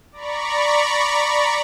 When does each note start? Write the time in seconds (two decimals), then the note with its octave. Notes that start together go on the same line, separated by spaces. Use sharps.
0.12 D5 A#5 B5 C#6